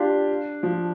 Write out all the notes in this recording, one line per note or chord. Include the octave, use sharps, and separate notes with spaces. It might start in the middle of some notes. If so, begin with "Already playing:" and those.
Already playing: D4 F4 G4
F3